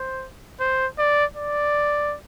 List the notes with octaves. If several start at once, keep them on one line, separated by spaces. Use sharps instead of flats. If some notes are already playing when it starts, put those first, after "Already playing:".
Already playing: C5
C5
D5
D5